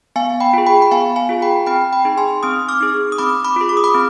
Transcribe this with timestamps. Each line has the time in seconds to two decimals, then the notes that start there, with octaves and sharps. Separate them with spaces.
0.16 B3 F5 G#5
0.40 G5 B5
0.53 F4 G#4
0.66 G5 B5
0.82 B5
0.92 B3 F5 G#5
1.16 F5 G#5
1.29 F4 G#4
1.42 G5 B5
1.66 C4 G5 B5
1.93 G5 B5
2.05 D#4 G#4
2.18 G#5 C6
2.43 C4 C6 D#6
2.69 D6 F6
2.81 D#4 G#4
3.12 D#6
3.18 C4 B5 D6
3.45 B5 D6
3.56 F4 G#4
3.69 D6
3.77 D#6
3.84 B5 D6
3.94 C4